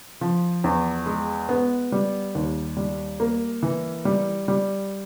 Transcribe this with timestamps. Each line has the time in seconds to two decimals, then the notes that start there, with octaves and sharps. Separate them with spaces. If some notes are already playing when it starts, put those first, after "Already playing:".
0.21 F3
0.64 E2
1.06 G#3
1.49 B3
1.92 G3
2.35 D#2
2.77 G3
3.20 A#3
3.63 E3
4.05 G3
4.48 G3